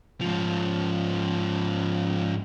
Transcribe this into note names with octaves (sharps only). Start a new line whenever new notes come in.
G#2 F3